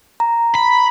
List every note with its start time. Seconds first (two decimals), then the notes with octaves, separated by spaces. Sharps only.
0.20 A#5
0.55 B5